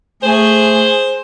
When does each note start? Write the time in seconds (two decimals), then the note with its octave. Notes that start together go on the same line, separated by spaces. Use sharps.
0.23 A3 G#4 C5